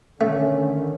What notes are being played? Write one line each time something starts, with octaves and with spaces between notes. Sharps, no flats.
D3 D#3 A3 C#4